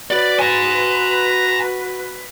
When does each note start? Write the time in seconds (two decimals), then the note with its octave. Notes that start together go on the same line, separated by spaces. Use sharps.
0.11 F#4 B4 D5
0.39 G#5 A#5